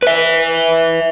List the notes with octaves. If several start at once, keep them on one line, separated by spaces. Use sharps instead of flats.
B4 E5